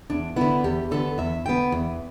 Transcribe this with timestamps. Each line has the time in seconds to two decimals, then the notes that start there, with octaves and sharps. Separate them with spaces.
0.10 E2 D4
0.36 D3 B3 E4
0.64 E2 G4
0.91 D3 B3 A4
1.18 E2 E5
1.46 D3 B3 G5
1.72 E2